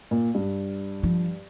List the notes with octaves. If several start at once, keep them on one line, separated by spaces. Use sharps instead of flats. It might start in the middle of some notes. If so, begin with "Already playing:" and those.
A#2
G2
F3